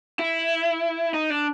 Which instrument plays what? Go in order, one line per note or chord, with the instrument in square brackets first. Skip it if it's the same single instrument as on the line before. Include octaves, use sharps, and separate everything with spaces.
[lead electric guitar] E4
D#4
D4